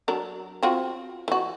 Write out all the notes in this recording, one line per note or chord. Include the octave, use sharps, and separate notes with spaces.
F#3 D4 A#4
C4 F4 F#4
E3 F#4